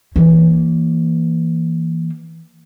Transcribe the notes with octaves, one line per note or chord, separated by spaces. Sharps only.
E3 A#3